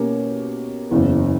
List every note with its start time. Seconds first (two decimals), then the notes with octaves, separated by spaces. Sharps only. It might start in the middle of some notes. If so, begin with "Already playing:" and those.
Already playing: B2 A#3 C#4 G4 C#5
0.91 F#1 E2 C#3